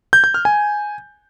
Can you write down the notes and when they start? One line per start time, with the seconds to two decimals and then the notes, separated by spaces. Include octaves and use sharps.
0.13 G6
0.24 G6
0.34 F6
0.45 G#5